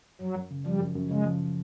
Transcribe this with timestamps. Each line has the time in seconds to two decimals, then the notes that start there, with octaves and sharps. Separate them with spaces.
0.21 F#2 F#3
0.35 F#2
0.51 C#3
0.66 F3 G3
0.81 F#2
0.95 F#2
1.10 C#3 G#3
1.26 F3